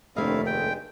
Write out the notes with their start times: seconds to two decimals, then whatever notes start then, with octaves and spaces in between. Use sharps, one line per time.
0.16 F1 D#2 A3 C4 D4 E4 D#5 F5
0.46 G2 G#3 G5